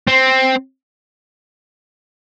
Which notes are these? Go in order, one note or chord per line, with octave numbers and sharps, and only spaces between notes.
C4